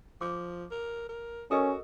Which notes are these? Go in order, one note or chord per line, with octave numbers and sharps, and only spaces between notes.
F3 D6
A#4
A#4
C#4 F#4 A4 A#4 D#5